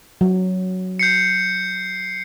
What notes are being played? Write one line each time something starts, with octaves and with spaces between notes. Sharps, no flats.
F#3
G6 C7 C#7